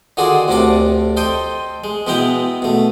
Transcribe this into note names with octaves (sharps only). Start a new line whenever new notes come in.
D3 D#3 F4 F#4 G#4 D5
D2 A2 C3 D4 A4 D6
A4 C5 D#5 G5
G#3
B2 G#3 B3 E4 G5 A#5
B2 A3